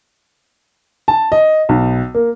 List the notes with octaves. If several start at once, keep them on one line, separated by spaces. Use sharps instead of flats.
A5
D#5
B1
A#3